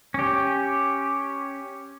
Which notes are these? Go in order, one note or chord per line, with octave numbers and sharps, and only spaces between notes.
C#4 G4